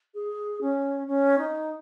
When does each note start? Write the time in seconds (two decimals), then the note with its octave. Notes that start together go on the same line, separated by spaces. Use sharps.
0.14 G#4
0.61 C#4
1.07 C#4
1.38 D#4